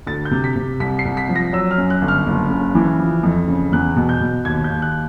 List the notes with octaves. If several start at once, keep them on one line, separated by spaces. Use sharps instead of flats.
D2 A6
G6
C3
B6
C3
C2 B6
C7
C2
B6
F3
A#6
F#3 E6
F6
F#2
F#6
G1
F6
F#1
C#3
E3
F3
F2
C#3
E2 F#6
B2
G6
B2
D#2 G#6
G6
D#2
F#6